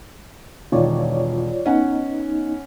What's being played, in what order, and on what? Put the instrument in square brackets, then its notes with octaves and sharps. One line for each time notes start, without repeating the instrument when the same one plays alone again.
[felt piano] E1 D#3 [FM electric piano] F4 C#5 D5
[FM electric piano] B3 D#4 [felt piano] C#4 F#5